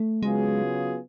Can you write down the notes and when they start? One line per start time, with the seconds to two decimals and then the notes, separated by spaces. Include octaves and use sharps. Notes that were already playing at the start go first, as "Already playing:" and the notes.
Already playing: A3
0.23 C#3 F#3 G#3 B3 F4 G#4